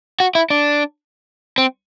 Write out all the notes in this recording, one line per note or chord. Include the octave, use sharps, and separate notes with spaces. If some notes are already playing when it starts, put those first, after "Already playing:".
F#4
E4
D4
C4